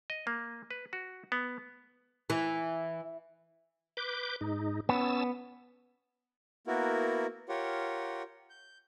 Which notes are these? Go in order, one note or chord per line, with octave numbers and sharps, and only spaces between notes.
D#5
A#3
B4
F#4
B3
E3
B4 D6 G6
G#2 D#4
B3 C#4 A5 E6
A#3 B3 E4 F#4 A#4
F4 G4 A#4 C#5 F#5
G6